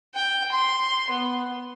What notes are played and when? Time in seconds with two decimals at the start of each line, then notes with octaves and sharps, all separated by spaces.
0.14 G5
0.52 C6
1.10 B3